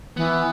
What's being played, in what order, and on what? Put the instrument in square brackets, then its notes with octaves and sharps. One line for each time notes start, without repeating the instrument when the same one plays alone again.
[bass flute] E3 [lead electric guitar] B3